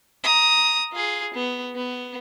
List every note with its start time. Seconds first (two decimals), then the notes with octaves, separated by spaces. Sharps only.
0.24 A#5 D#6
0.93 F4 G#4
1.34 B3
1.75 B3